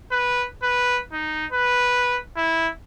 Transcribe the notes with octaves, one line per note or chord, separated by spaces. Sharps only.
B4
B4
D#4
B4
E4